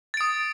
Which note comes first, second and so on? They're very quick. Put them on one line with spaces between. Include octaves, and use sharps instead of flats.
A6 D7 D#6